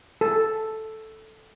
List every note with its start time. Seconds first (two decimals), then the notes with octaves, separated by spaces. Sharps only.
0.21 A4